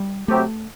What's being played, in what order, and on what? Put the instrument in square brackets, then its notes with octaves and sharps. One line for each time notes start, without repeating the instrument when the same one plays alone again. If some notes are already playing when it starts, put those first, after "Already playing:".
Already playing: [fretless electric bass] G3
[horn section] C3 F#3 C4 G4 [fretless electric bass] A3